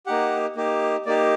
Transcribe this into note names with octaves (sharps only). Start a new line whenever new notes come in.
A#3 D#4 G4 F#5
A#3 D#4 G4
A#3 D#4 G4 D5